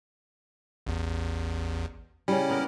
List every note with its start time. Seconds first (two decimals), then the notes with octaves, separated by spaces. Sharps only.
0.87 A1 E2
2.28 C#3 G3 C#4 E4
2.49 A#3 B3 A#4